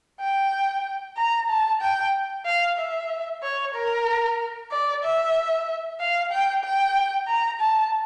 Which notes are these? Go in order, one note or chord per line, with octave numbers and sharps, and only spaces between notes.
G5
A#5
A5
G5
F5
E5
C#5
A#4
D5
E5
F5
G5
G5
A#5
A5